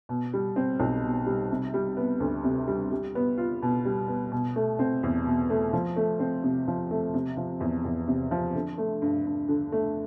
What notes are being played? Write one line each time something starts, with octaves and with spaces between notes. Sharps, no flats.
B2
G3
C4
B1
B2
G3
C3
G3
B3
D2
C3
G3
G3
B3
F4
B2
G3
B3
B2
A3
C4
E2
B2
A3
F3
A3
C4
C3
F3
A3
C3
F3
E2
E2
C3
F3
D3
A3
G2
G2
D3
A3